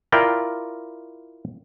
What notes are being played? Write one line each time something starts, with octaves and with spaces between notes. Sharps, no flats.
E4 F4 A#4 D5 G5